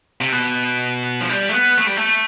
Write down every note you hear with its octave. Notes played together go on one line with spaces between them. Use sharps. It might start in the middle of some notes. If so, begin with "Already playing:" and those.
C3
B2
F3
G3
A3
B3
A3
G3
A3